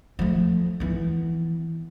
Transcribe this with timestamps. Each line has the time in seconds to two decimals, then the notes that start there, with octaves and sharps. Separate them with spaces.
0.19 F3 A3
0.80 E3 B3